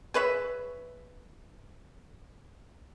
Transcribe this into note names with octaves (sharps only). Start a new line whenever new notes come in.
G#4 B4 C#5 E5